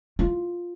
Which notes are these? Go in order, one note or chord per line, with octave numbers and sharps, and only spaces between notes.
F4